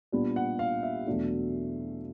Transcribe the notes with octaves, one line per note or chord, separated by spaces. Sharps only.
A#2 G3 B3 D4
F#5
F5
E5
E2 B2 F#3 A3 D4